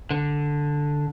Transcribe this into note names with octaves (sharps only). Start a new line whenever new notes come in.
D3